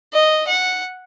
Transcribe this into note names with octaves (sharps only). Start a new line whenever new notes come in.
D#5
F#5